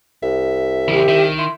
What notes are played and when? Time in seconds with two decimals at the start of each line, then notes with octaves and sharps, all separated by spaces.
0.23 C2 E5
0.88 C#3 E3 G4
1.08 D#3 E5
1.38 E4 C6